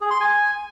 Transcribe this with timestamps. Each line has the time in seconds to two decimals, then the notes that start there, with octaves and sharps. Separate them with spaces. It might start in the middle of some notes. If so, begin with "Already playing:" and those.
0.01 G#4
0.11 C6
0.20 G#5